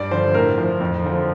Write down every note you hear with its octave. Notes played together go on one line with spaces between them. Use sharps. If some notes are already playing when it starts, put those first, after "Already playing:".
Already playing: G2 D5
D3 F3 C5
A2 A#4
F3
F2
D3 F3